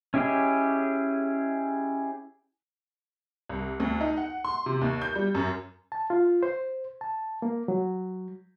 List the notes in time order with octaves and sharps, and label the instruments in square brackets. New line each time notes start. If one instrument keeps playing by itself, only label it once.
[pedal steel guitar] C#4 E4 G4 G#4 D#5
[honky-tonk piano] C2
D2
D#4
F#5
C6
C3
D#2
G6
G3
F#2
[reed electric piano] A5
F4
C5
A5
A#3
F#3